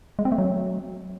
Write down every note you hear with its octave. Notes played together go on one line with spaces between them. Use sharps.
G#3
C4
A3
F#3